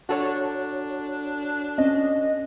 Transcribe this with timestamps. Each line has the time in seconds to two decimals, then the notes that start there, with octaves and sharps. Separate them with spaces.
0.09 D4 F#4 A4 C#5
1.78 C#4 D#5